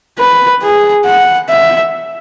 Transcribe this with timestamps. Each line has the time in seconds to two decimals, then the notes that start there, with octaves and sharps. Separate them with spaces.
0.19 B4
0.62 G#4
1.06 F#5
1.49 E5